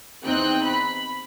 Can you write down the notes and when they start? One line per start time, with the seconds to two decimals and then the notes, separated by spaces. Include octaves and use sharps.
0.23 E2 C4 D#4 G5 F#6
0.67 B5